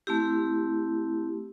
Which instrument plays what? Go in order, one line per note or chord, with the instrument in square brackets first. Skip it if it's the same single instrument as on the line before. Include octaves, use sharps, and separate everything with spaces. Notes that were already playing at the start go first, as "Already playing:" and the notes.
[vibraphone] A3 C4 E4 G4